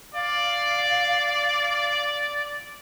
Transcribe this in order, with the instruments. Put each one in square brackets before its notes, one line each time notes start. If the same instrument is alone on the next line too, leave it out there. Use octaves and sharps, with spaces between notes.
[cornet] D5 [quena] F5